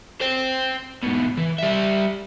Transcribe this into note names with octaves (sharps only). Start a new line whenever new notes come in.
C5 G5
G#2 B2
E3
G3 E5